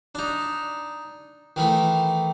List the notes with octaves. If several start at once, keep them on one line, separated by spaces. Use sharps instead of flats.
D4 D#4
D#3 E3 A3